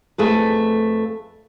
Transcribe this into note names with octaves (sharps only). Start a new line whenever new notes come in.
F2 A3 G#4 B4